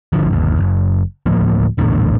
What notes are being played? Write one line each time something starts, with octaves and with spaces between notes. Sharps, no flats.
G#1 D3 F3
G1 D#2
F#1
D2 A2 F3 A#3
A#1 E2 A2 D3